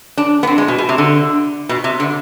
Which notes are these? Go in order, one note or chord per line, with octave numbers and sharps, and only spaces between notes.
D4
B3
C4
G#3
B2
B2
C3
D3
B2
C3
D3